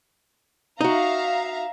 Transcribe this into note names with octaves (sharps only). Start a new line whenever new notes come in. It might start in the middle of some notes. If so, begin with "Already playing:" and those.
D#4 F#4 E5 F5 A#5